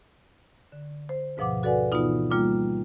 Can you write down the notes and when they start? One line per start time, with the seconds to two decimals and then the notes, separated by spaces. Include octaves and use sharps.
0.72 D3
1.09 C5
1.37 D2 G#2 B2 F3 F#5 D6
1.63 F#4 A4 B4 D5 F#5 G#5
1.92 B2 E3 B3 D#4 F4
2.30 G3 A#3 F4 G5 D6